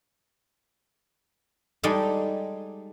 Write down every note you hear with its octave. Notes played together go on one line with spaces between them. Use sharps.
G3 G#3 D#4 A4 D5